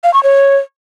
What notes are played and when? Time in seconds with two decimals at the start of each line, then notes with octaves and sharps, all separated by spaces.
0.04 F5
0.14 C#6
0.23 C#5